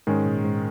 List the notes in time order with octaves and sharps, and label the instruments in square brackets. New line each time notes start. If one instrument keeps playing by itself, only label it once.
[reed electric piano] G#2 [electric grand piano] D#3 G#3 C#4
[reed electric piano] A#2
G#2